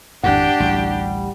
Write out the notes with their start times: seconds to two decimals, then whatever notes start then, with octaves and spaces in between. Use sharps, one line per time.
0.24 G#1 F2 A2 D4 G4 F#5
0.60 A1 D2 G3